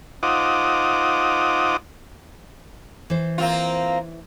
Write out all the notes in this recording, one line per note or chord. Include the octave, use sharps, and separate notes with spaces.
D#4 F4 C5 F#5 D6 D#6
E3 C5
A#3 C4 F4